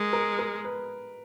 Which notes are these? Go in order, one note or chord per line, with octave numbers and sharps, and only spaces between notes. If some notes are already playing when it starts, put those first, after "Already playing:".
Already playing: G#3 A#4
A#4
A#4
B4